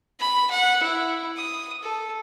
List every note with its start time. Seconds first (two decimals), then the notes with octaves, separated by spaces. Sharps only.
0.20 B5
0.51 F#5
0.82 E4
1.37 D#6
1.83 A4